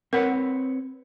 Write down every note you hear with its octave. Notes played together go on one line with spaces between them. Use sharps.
C4 A#4 B4 C#5 F#5